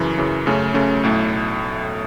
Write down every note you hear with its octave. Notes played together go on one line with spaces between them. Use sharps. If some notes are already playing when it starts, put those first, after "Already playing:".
Already playing: F#2 C#3 E3
F#2 C#3 E3
F#2 C#3 A3 C#4
F#2 C#3 A3 C#4
B1 A2 A3